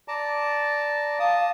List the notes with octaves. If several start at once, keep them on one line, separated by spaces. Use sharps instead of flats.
D5 A5 A#5
F5 A5 D#6